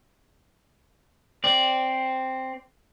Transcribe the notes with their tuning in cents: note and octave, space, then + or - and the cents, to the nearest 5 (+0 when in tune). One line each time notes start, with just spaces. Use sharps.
C4 +0 D5 -10